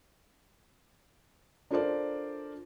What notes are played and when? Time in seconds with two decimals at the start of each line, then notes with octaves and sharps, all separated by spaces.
1.71 D4 F4 A4 A#4 C5 D5